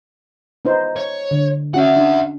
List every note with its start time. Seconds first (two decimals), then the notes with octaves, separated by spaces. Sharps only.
0.65 B3 D#4 C5
0.96 C#5
1.31 D3
1.74 C#4 F#4 E5 F#5
1.97 D4